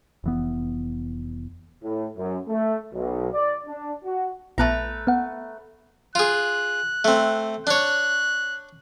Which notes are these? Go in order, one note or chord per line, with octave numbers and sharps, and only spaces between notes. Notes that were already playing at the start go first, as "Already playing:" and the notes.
F1 E3 B3
A2
F#2
A3
B1
D5
D4
F#4
A#1 A3 B3 B4 A5 A#5
B3 F#5
F4 G#4 F#6
A3 C4
D4 C#5 F#6